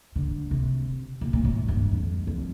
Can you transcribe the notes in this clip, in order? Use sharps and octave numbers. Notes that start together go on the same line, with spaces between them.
D3
C3
A#2
A#2
A2
G2
F2
F2